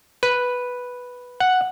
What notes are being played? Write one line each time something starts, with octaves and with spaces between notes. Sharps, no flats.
B4
F#5